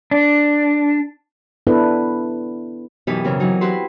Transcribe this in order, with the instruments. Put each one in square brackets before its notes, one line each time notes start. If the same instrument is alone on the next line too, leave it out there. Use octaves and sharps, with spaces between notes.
[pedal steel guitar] D4
[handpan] B3 D4 E4 A4 B4
[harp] F#2 B2 E3 D#4 G4 B4
F#2 C#3 C4 A#4
E3 F#3 D#4
E4 F#4 G4 B4 B5 C6